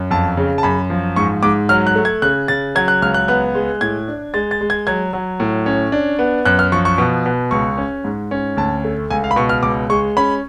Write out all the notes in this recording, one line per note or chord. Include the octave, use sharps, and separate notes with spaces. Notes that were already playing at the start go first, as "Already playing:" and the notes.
Already playing: F#2
F2 A5
C#3
A5
F#2 B5
F3
G#2 C#6
G#2 D6
F#3 F6
F#6
A3
G#6
C#3 F#6
C#3 A6
F#3 G#6
F#6
C#2 F6
F#6
B3 F#6
G#3
A2 G#6
D4
G#3 A6
A6
G#3
G#6
F#3 G#6
F#3
A2
C#4
D4
B3
F#2 F#6
F6
F3 C#6
C#6
B2
B2
C#2 C#6
C#4
G#2
C#4
D2 A5
A3
C#2 G#5
F5
B5
B2 C#6
F6
C#2 D6
G#3 C#6
C#4 B5